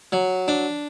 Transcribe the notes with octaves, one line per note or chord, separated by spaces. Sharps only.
F#3
D4